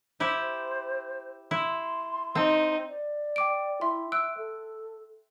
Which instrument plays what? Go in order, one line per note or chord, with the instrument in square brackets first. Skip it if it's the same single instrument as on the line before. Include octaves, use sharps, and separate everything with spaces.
[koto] E4 G4 [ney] C5
[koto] E4 [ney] C6
[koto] C4 [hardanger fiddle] D#4
[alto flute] D5
[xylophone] G5 D6 D7
[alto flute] E4 [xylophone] E5 C6
[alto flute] E5 [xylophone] E6 F#6 D7
[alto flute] A4